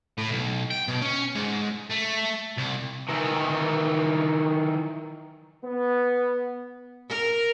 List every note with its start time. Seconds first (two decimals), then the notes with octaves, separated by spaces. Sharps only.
0.18 A2
0.31 B1
0.71 G5
0.88 B2
1.02 C#4
1.35 G#2
1.90 A3
2.57 C2
3.09 D#3 E3
5.65 B3
7.09 A#4